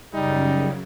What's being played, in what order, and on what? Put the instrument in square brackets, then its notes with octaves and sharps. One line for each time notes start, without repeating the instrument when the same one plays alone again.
[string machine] F#2 C#3 [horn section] G3 D#4